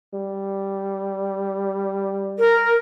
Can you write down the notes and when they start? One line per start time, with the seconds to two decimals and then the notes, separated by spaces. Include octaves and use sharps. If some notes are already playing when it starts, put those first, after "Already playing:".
0.14 G3
2.39 A#4